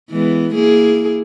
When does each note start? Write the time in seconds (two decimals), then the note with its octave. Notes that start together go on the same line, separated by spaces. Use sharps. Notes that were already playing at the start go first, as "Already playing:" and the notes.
0.10 E3 G#3 B3
0.55 A#3 E4 G#4